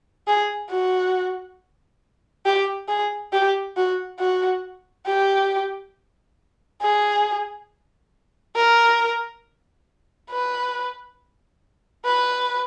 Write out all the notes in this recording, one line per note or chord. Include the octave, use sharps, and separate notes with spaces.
G#4
F#4
G4
G#4
G4
F#4
F#4
G4
G#4
A#4
B4
B4